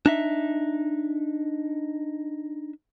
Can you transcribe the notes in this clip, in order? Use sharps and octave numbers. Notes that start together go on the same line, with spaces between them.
D4 D#4 E5